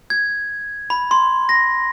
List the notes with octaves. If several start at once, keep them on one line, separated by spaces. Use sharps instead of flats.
G#6
B5
C6
A#6